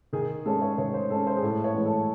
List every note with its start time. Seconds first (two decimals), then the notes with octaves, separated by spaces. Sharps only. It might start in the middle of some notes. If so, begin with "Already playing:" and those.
0.13 D#3 G#4
0.46 G#3 C#4 A4
0.62 C#5
0.78 D#3 C#5
0.94 C5
1.10 G#3 C#4 A4
1.27 C5
1.37 G#4
1.43 A2 A4
1.64 C#5
1.75 E3 G#3
1.85 A4